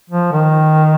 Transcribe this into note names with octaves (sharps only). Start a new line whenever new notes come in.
F3
D#3